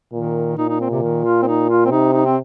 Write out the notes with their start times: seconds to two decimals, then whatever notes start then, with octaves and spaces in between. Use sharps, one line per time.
0.12 A#2 D#3
0.57 A#2 D#4
0.69 D#4
0.80 C4
0.90 C3
1.02 D#3
1.25 F4
1.42 C4
1.47 D#4
1.69 F4
1.85 C4
1.91 C3 D#4
2.13 D#4
2.26 C4